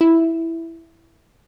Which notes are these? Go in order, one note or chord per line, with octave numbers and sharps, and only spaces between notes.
E4